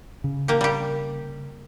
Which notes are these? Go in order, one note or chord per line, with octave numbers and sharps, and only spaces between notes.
C#3
A#3 G4
G3 G4